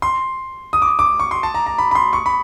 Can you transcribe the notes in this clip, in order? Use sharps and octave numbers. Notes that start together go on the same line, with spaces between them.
C6
D#6
D6
D6
C#6
C6
A5
A#5
A#5
B5
B5
C6
C#6
B5